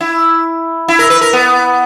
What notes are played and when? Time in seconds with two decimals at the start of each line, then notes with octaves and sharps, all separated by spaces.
0.01 E4
0.88 E4
0.99 A#4
1.10 B4
1.21 A#4
1.33 B3